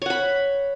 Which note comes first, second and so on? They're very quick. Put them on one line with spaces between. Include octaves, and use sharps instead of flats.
C#5 F#5 B5